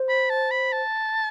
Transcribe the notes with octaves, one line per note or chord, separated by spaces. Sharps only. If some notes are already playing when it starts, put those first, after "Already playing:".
Already playing: C5
B5
A5
B5
A5